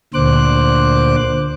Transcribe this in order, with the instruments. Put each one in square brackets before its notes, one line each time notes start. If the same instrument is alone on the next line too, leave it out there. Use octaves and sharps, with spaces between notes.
[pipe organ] D2 A#2 D3 C5 D6 F#6